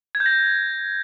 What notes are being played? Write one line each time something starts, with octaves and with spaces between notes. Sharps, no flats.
G#6
G6
A#6